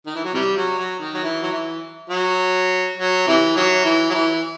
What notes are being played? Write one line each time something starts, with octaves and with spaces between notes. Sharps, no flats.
D#3
E3
F#3
C3 E3 G3
F#3
F#3
D#3
F#3
E3
F#3
E3
F#3
F#3
C3 E3
D#3 F#3
E3
F#3
E3